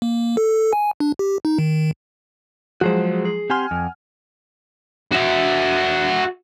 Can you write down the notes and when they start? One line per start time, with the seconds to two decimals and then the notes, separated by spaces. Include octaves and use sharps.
0.02 A#3
0.37 A4
0.73 G#5
1.00 D4
1.19 G4
1.45 D#4
1.59 D#3
2.81 F3 F#3 G#3 F#4 G#4 C5
3.25 G#4
3.50 C4 G4 F#5 G#5 C6 F6
3.71 F2
5.12 F#4 E5